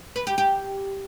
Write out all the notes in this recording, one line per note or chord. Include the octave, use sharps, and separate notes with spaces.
B4
G4
G4